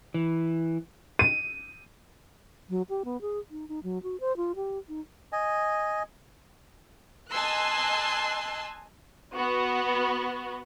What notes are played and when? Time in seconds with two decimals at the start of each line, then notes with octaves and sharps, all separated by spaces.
0.14 E3
1.19 D#7
2.69 F#3
2.89 G4
3.05 B3
3.21 G#4
3.51 D#4
3.69 D#4
3.83 F#3
4.03 F#4
4.20 C5
4.37 F4
4.56 G4
4.89 D#4
5.32 D#5 G#5
7.31 D#5 G#5 A5 C6 E6 F#6
9.34 B3 F#4